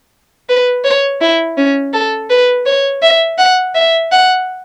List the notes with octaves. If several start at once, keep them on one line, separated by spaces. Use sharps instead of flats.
B4
C#5
E4
C#4
A4
B4
C#5
E5
F#5
E5
F#5